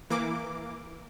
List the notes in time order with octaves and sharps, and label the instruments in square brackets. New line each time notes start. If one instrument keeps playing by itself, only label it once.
[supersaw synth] E3 A#3 D6